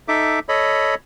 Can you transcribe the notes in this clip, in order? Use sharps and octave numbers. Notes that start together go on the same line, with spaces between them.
D#4 A4 E5 D6
A4 C#5 D#5 B5